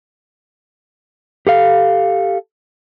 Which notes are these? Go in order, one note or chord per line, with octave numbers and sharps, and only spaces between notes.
G4 A4 F5